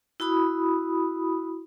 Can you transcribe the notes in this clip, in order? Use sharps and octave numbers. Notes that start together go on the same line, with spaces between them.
E4 F#4 B5 D#6